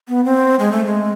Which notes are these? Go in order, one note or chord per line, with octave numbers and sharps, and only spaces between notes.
B3
C4
G#3
A3
G#3